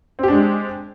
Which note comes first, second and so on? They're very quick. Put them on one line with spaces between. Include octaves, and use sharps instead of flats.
C4 G4 D4 G#3